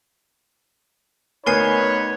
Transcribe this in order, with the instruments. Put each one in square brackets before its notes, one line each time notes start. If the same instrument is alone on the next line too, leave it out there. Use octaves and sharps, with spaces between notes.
[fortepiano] D2 B3 [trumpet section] D#4 B5 [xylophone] A#4 G#5 C7 [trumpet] C#5